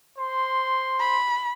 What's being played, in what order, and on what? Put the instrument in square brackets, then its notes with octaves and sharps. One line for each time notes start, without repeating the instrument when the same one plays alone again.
[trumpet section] C5 C6
[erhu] B5